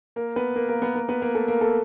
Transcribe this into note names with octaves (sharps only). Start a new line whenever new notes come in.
A#3 A#4
B3 B4
A#3 A#4
A#3 A#4
B3 B4
A#3 A#4
B3 B4
A#3 A#4
A3 A4
A#3 A#4
A3 A4